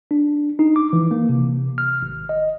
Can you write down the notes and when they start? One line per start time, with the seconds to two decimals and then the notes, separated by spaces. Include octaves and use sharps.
0.11 D4
0.59 D#4
0.76 D6
0.93 E3
1.11 A#3
1.29 C3
1.78 F6
2.02 G#1
2.29 D#5